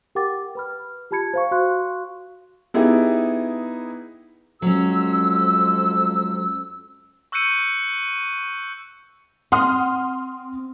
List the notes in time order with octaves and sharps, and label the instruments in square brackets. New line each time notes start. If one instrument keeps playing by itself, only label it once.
[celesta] G4 A#4 F#5 G5 D6 A6
B4 B5 F6
F4 G4 A5 B5 G#6 C#7
C5 F5 C#6
F#4 F5 C6 C#6 F#6
[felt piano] B3 D#4 E4 G4 G#4
[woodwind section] F2 G#3 E6 [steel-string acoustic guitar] F#3 C#4
[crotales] C#6 E6 F#6 G6 C#7 D#7
[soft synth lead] C4 [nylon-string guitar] F#5 [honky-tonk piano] C6 D#6 F6